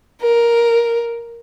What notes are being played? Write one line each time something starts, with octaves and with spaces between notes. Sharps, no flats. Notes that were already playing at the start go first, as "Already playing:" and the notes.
A#4